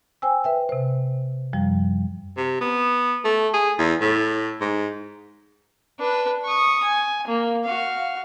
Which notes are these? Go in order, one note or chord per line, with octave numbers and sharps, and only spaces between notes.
C5 G5 G#5 E6
B4 E5 G5
C3 C5
F#2 F3 G3
C3
B3
A3
G#4
E2
A2
G#2
D4 B4
C#6 D#6
G#5
A#3
F#4 F5